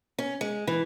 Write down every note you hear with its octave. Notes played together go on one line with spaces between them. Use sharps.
C#4
G#3
E3